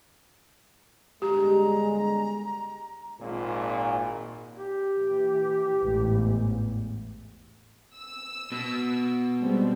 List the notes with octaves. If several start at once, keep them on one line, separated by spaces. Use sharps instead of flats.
G1 D3 G#3 G4 A#5
G#1 A#2
G4
A#2 E3
A1 E2 G#2
E6
B2
G3 G#3 C4